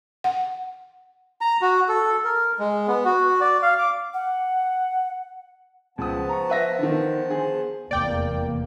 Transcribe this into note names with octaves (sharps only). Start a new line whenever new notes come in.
F#5
A#5
F#4
A4
A#4
G#3
B3
F#4
D5
F5
D6
F#5
C#2 F3 B3 A5 D#6
A#5 C#6
B4 E5 A#6
D3 D#3
G#4 C5
F1 E2 A#3 D5 G5